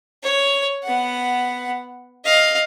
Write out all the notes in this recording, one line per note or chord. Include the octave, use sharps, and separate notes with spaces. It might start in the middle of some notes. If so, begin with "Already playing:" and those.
C#5
B3 F#5
D#5 F5